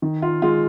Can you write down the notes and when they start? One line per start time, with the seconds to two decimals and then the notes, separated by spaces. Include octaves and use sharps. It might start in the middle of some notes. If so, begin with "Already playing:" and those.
0.02 D#3
0.22 F4
0.42 G#3 F4